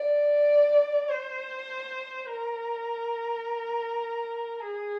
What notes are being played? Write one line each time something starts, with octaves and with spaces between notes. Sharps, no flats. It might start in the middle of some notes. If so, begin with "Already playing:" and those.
Already playing: D5
C5
A#4
G#4